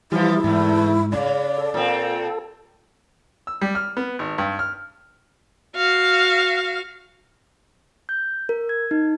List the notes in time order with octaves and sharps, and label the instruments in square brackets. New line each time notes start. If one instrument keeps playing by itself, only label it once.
[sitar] E3 F3 [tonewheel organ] G3 [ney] E4
[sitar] E2 A3 [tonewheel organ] G#2
[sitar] C#3 [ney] D5
[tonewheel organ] A4
[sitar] A#2 C4
[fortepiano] E6
G3
F6
B3
G#1
G2
F6
[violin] F#4 F5
[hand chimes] G6
A#4
G#6
D#4